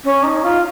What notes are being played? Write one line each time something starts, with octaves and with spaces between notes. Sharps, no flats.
C#4
D#4
F4